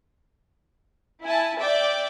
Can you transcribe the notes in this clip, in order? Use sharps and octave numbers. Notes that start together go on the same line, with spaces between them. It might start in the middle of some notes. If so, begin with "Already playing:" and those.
E4 G#5 A5
D5 E5 G5 D6